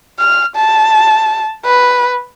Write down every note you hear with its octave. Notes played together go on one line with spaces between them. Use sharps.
F6
A5
B4